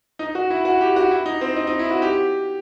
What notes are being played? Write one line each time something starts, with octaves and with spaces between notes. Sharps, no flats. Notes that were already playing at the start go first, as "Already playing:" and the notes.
D#4
F#4
E4
F#4
G4
F#4
E4
D#4
C4
D#4
D#4
E4
F#4
G4